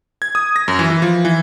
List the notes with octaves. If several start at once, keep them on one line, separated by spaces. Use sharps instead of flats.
G#6
D#6
A#6
F#2
E3
E3
F3
E3